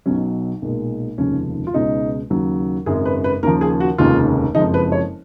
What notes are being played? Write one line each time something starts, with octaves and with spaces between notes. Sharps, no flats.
B1 B2 F#3 C#4
B1 A#2 G#3
F1 D#2 C#3 F3 G#3 C#4
F4
C#2 B2 G#3 D#4
D#2 C#3 F#3
G#1 F#2 C#3 G#3 G#4
B4
B4
D#2 C#3 F3 A#4
G#4
F#4
F1 D#2 C#3 G#3 F4
F#1 F2 F3 G#3 D#4
B4
C#5